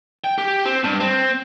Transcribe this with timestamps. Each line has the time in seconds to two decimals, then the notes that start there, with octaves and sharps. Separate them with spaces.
0.24 G5
0.38 G4
0.65 C4
0.84 G2
1.00 C4